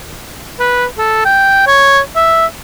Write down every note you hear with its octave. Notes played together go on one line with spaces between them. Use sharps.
B4
A4
G5
C#5
E5